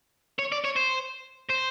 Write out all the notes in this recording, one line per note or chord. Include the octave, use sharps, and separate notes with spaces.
C#5
D5
C#5
C5
C5